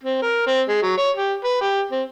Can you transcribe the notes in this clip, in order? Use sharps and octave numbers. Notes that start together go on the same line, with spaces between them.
C4
A#4
C4
G#3
F#3
C#5
G4
B4
G4
C4